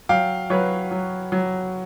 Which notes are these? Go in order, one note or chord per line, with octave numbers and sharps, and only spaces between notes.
F#3 F5 G5
F#3 B4 C#5
F#3
F#3